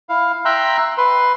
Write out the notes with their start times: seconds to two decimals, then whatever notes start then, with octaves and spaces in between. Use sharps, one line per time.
0.09 E4 F5
0.45 E5 G5 A#5 C6 E6 F#6
0.98 B4 C6